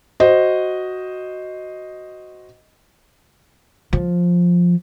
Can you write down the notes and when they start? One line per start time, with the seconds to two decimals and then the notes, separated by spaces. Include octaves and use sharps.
0.20 F#4 C5 D#5
3.93 F3